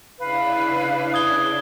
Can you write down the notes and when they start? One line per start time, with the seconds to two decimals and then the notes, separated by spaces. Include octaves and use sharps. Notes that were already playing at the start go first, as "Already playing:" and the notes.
0.19 C#3 D4 E4 B4 F5
1.14 D#6 G#6 G7